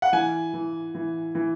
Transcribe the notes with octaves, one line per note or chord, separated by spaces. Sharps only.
F#5
E3 G#5
E3
E3
E3